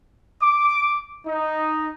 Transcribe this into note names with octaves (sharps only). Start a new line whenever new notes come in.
D6
D#4